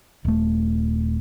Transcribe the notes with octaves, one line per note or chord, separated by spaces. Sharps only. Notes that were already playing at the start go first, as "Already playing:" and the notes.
D#1 A3